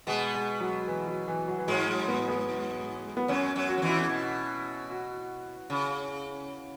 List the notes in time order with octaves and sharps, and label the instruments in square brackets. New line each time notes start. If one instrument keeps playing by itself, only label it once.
[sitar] B2 B3 [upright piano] G#3
[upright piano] G#3
F#3
E3
F#3
E3
F#3
E3
[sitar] G#2 G#3 [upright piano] F#3
[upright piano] F#3
B3
B3
B3
[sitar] F#2 F#3 [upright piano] C#4
[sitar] F#2 F#3
[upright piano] F#4
[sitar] F#3
E2 E3
[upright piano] E4
[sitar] B2
[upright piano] F#4
[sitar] C#3